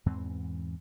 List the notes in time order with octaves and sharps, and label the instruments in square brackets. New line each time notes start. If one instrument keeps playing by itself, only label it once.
[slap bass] E2 G#2 E3 C4